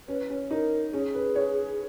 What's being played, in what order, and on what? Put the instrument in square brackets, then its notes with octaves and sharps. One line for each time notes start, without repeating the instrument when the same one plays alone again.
[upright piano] C#4 [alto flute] B4
[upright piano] C#4
[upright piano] D#4 [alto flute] A#4
[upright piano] C#4 [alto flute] G#4
[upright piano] B4
C#5